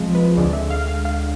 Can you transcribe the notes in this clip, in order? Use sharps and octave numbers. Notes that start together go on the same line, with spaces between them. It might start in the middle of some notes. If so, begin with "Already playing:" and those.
Already playing: C2 C3 F3 G#3
B4
D2 D3 G#3 D5
E5
F5
F5
F5